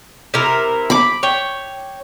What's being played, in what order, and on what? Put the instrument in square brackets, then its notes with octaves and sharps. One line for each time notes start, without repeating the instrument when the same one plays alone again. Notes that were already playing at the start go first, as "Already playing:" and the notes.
[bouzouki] C3 E4 A#4
[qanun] B5 D6
[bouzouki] C#5 G5